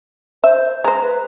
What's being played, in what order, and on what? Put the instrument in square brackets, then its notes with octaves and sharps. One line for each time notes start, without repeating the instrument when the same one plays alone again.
[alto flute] C5 [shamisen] E5
[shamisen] G#3 C5 [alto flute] A#5
[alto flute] B4